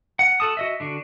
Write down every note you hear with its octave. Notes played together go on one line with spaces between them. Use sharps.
F#5
F#4 A4 A5 D#6
F#4 D#5 E5
D3 D4 F#4